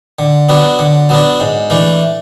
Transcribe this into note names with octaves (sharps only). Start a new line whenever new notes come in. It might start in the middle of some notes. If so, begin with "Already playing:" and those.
D3
F#3 B3 D4
D3
F#3 B3 D4
G#2
E3 A3 D4